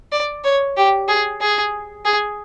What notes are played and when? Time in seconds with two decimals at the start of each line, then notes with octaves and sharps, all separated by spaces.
0.12 D5
0.44 C#5
0.77 G4
1.08 G#4
1.41 G#4
2.05 G#4